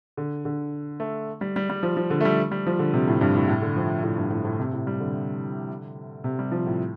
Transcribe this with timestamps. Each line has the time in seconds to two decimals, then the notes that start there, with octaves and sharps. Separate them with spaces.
0.17 D3
0.45 D3
1.00 A3
1.41 G3
1.56 G3
1.70 G3
1.83 F3
1.97 F3
2.10 D3
2.21 A3
2.25 G3
2.52 G3
2.67 F3
2.79 D3
2.94 C3
3.08 A2
3.21 G2
3.36 A2
3.48 A2
3.62 D3
3.76 F3
4.04 A2
4.18 G2
4.31 A2
4.45 A2
4.59 C3
4.73 A2
4.87 G3
5.00 D3
6.24 C3
6.39 G3
6.52 F3
6.66 A2